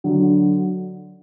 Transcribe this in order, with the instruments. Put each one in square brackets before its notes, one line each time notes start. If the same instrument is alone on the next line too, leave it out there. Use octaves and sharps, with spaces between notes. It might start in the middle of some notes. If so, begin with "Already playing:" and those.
[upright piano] D3 F#3